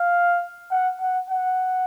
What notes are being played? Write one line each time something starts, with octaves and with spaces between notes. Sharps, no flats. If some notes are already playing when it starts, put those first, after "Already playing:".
Already playing: F5
F#5
F#5
F#5